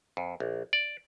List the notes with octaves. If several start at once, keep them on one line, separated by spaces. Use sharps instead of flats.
F2
A#1
D5